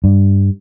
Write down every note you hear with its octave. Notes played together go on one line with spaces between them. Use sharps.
G2